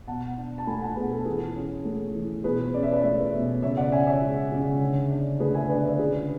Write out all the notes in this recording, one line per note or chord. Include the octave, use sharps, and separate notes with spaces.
B2 F#5 A5
D4
A5
A3 G#5 B5
F#5 A5
B2 G#4 B4
A4
E3 G#4
C#4
A3
E3
B2 G#4 B4
C#4 D5
E5
B4 D5
A3 C#5 E5
B2
C#3 C#5 E5
D5 F#5
C#4 E5 G#5
C#5 E5
G#3
C#3
D3
D4
A3 G#4 B4
E5 G#5
D3 B4 D5
B4 D5
C#3 G#4 B4